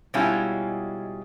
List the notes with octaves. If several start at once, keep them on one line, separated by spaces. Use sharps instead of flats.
B2 G3 G#3 C#4 E4 F4